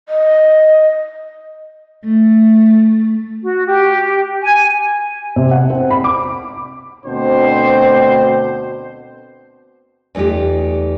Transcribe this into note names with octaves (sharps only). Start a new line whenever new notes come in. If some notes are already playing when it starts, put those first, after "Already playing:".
D#5
A3
F#4
G4
G#5
C3
F#5
C4
B5
D6
D2 B2 C4 D4 C5
E2 A3 D#4 F4 G4